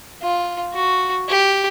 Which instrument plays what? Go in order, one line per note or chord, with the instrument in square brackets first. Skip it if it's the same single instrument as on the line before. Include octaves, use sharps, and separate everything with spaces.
[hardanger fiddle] F4
F#4
G4